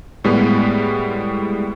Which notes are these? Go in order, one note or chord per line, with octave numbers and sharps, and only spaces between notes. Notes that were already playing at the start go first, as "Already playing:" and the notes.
A2 G3 G#3 B3